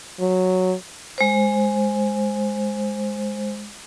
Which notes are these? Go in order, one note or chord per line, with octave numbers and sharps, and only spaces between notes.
F#3
G#3 C5